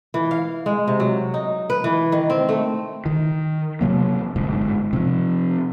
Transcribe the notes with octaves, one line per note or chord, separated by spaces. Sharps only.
E3
F5
G#3
C3
F#3
D#4
B4
E3
D#3
C4
A3
D#3
C3 F#3 A#3
G1 G#2
C3 F3